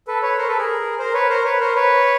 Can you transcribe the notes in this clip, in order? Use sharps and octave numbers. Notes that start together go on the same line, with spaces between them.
A4 B4
B4 C#5
A#4 C5
A4 B4
G#4 A#4
A#4 C5
B4 C#5
A#4 C5
B4 C#5
A#4 C5
B4 C#5